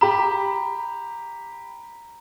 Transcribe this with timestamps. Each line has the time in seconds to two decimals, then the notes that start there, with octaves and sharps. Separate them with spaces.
0.01 G4 A#5 B5